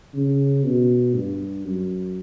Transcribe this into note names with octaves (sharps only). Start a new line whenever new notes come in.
C#3
B2
G2
F#2